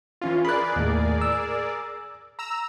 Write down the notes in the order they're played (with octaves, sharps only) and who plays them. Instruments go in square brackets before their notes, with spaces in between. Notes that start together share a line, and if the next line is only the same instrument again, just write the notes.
[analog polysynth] E3 C#4 F4
[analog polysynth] G#4 A#4 D5 [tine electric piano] B5 F#6
[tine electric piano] D#2 A2
E6
[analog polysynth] A#5 E6